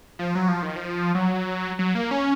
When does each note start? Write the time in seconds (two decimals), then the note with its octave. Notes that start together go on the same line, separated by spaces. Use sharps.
0.19 F3
0.35 F#3
0.48 F3
0.62 D#3
0.76 F3
1.15 F#3
1.79 F#3
1.95 A#3
2.11 C#4